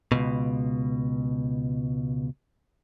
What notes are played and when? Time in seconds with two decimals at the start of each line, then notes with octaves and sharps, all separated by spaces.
0.12 C#2 F#2 B2